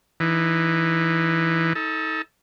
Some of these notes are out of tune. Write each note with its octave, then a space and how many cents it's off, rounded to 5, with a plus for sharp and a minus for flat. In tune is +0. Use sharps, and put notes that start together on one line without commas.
E3 +0 D#4 -20
D#4 +35 A4 +0